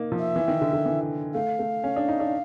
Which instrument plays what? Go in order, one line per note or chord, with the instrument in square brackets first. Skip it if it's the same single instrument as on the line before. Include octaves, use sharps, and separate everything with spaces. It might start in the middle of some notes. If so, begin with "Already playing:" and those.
Already playing: [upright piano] A#3 D#4
F3
[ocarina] E5
[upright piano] E3
D#3
D3
D3
E3
[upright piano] A3 [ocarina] F5
[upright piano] A3
C#4
D4
D#4
D4